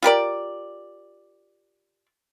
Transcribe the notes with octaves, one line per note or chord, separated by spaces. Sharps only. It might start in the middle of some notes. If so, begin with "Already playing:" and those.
F4 G4 A#4 D5